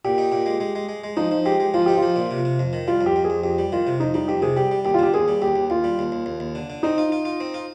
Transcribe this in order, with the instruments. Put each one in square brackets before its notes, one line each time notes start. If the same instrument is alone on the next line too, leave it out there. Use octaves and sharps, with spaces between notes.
[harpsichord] A#2 [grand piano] G4
[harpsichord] D#4
A#2
G#3
G#3
G#3
G#3
G#3
[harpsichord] F3 [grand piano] D#4
[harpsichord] F3
[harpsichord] G#3 [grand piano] G4
[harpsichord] G#3
[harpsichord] F3 [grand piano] F4
[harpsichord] D#4 [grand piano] G4
[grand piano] F4
[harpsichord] F3
A#2
C3
C3
F2
D#3
[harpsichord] G3 [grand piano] F4
[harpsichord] F2
[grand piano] G4
[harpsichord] F2
[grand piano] G#4
[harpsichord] F2
[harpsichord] F2 [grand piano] G4
[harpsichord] G3
[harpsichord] D#3 [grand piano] F4
[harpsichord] C3
[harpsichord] F2 [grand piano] D#4
[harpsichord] G3 [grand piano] D#4
[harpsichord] F2 [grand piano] G4
[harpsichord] C3 [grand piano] G#4
[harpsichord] G3 [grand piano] G4
[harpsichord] G3
[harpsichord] D#2 [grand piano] G4
[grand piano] F4
[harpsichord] D3 [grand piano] G4
[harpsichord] D#2 [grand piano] G#4
[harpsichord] G3
[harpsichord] D#2 [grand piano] G4
[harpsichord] D#2
[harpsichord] D#2 [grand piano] F4
[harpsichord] G3
D#2
D#2
D#2
D#2
D3
D3
[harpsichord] C4 [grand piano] D#4
[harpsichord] F4
F4
F4
C4
F4